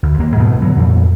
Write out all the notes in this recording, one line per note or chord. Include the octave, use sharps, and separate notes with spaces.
D2
D#2 A#3
G#2 B2 E3 A3
D3 F#3 B3
F2 A#2 E3